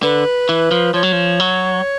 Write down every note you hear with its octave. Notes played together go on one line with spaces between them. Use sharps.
D3 B4
E3
F3
F3 C#5
F#3
F3
F#3